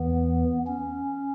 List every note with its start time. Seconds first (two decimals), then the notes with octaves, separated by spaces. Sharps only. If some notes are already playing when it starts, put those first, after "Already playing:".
Already playing: E2 E3 B3
0.67 C#4